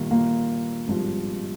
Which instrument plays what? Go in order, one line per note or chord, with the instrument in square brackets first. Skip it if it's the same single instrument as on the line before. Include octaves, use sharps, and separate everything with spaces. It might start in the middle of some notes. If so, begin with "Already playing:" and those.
Already playing: [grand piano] G1 G2 A#2 D#3 A#3
A#2 A#3
G#1 G2 F3